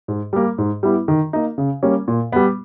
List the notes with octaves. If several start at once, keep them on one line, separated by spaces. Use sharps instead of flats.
G#2
G3 A#3
G#2
G3 B3 E4
D#3
A#3 D#4
C#3
G3 A#3 C#4
A#2
G3 B3